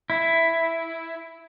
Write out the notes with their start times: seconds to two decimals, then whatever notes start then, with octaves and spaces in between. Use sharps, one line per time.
0.10 E4